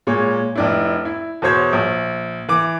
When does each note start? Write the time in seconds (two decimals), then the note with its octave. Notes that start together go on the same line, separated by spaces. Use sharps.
0.07 A#2 G#3 C#5
0.56 F1 D4 E4
1.05 E4
1.42 E2 B2 C5 C#5 G#6
1.73 A#1
2.49 E3 D6